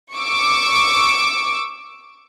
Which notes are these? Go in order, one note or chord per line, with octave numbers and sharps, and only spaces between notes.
C#6 D6 E6